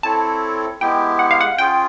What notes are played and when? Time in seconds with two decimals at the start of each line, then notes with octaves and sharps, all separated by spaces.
0.03 C4 E4 A4 C#5 A5
0.81 G#3 B3 E4 G4 G5
1.19 F#5
1.31 F5
1.41 F#5
1.58 C#4 F4 G#4 G5